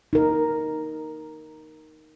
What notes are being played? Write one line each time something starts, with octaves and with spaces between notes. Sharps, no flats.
D#4 A#4